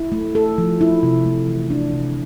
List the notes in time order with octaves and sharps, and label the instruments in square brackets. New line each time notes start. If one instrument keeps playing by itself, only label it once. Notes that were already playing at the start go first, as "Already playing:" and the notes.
Already playing: [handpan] E4
A3
A4
F3
E4
C3
A3
E3
D4
C3